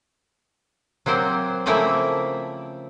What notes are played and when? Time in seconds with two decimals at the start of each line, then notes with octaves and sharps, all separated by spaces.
1.06 F#3 A#3 C4 C5
1.66 C#3 F3 A3 A#3 C4 E4